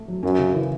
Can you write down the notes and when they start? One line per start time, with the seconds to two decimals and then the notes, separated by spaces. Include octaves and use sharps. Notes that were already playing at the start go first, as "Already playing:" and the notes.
Already playing: A3
0.08 F#3
0.23 F#2 C#4
0.39 C#3
0.54 E3